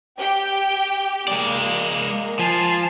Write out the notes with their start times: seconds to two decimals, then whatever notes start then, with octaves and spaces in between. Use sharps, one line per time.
0.18 G4 G5
1.28 G#3 A#3 D5
2.39 F3 G#5 A5 C7